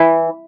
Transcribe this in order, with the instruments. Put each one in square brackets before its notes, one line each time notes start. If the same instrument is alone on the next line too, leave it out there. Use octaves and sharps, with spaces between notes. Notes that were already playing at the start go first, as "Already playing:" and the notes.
Already playing: [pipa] E3 [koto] E4